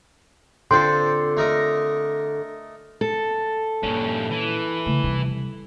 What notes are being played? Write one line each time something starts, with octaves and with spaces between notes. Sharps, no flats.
D3 C4 F4 A4 C5 G5 C6
A3 A#4 D#5
A4
G2 A#2 C#4
E3
C#3 A3
C3 G3